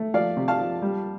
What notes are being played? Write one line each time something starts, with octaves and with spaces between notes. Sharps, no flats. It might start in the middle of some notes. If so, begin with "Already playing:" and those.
Already playing: A3
F3 D5 F5
C3
F5 A5
F3
G3